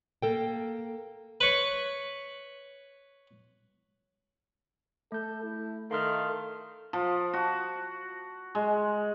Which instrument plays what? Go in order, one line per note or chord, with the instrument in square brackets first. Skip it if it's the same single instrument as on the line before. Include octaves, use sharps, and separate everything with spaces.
[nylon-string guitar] A#3 A4 G5
[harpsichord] B4 C#5
[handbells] A3 G6 [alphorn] A4
[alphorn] E4
[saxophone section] D#3 A3 [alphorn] A4 [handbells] F5 C6 F6
[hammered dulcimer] F3
F#4
G#3